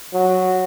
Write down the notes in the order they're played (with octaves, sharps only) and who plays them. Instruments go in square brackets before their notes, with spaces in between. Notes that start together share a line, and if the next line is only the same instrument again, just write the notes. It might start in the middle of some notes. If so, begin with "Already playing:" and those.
[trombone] F#3